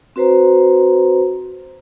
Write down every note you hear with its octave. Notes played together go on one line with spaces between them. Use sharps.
C4 F#4 B4 C5 A#5